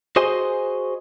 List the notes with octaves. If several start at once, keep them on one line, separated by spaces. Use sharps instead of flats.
F#4 G#4 C5 D#5 G#5 C6